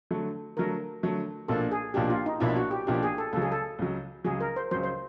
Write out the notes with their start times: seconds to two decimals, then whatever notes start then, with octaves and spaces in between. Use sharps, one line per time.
0.11 D3 F#3 A3
0.57 D3 F#3 A3 A#4
1.03 D3 F#3 A3
1.48 B1 A#2 F3 A#3 D4 A4
1.71 G#4
1.94 B1 A#2 F3 A#3 D4 G4
2.10 F4
2.26 D#4
2.40 B1 A#2 F3 A#3 D4 E4
2.56 F#4
2.71 G4
2.87 B1 A#2 F3 A#3 D4 G4
3.03 G#4
3.18 A4
3.33 C#2 C#3 F#3 A4
3.42 G#4
3.52 A4
3.79 C#2 C#3 F#3
4.25 C#2 C#3 F#3 G#4
4.40 A#4
4.56 C5
4.71 C#2 C#3 F#3 C5
4.83 C5